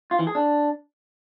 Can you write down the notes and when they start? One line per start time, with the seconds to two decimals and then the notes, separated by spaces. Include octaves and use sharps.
0.11 F4
0.19 E3
0.27 G#4
0.35 D4